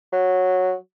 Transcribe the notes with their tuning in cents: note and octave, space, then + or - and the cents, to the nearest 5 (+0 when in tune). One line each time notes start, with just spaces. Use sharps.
F#3 -10